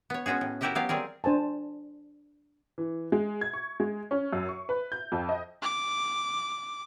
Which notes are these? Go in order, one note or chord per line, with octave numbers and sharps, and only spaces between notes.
B3 C#5
G#3 B3 C#4 F#4 G#4
A2
E4 F#4 G4 A#4 D#5 E5
F#3 B3 F4 G4 F5
G3 C4 G#4 A#4
D4 C5 G#5 A5
E3
G#3
G#6
C#6
G#3
C#4
F#2
C#6
B4
G6
F2
D#5
D6